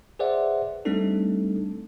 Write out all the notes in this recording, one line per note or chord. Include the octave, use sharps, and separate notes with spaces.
G#4 B4 C5 D5 E5 F#5
G3 A3 C4 D4 D#4 A4